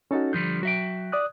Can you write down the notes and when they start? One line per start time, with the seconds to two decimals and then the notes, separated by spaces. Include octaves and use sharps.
0.11 C#4 D#4 F#4 A4
0.33 D3 F3 G3 G6
0.63 F#3 F#4 E5 G5
1.12 D5 D#6 F#6